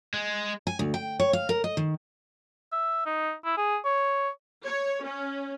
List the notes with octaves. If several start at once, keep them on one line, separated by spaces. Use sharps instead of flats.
G#3
G#5
D2
G5
C#5
F5
A#4
D#5
D#3
E5
D#4
E4
G#4
C#5
C#5
C#4